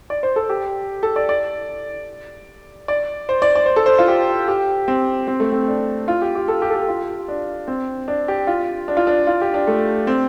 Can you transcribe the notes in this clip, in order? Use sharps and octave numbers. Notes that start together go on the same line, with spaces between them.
D5
C5
A4
G4
A4
D5
D5
D5
C5
D5
D5
C5
A4
C5
F4
G4
G4
C4
C4
A3
C4
D4
F4
G4
G4
A4
G4
A4
G4
F4
D4
C4
D4
G4
F4
D4
F4
D4
F4
G4
D4
A3
C4